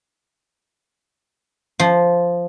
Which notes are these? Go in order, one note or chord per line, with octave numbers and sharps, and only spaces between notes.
F3